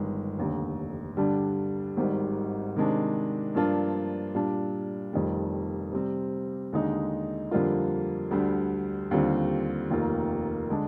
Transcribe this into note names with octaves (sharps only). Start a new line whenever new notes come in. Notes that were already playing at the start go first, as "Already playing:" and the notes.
Already playing: G1 G2 D#3 G#3
F1 D#2 D3
G2 D3 G3 D4
G#1 G#2 D#3 G3
C3 D#3 G#3 D4
G2 F3 A#3 D4 F4
A#2 G3 D4
F1 F2 D#3 G3
C3 G3 C4
D#2 D3 G#3 D#4 G#4
F2 D3 G3 A#3 F4
D2 D3 G3
D#2 D3 G3 C4 F4
F1 D#2 D#3 A#3 F4
D3 G#3 D4